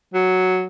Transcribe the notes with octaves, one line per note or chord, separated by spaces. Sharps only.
F#3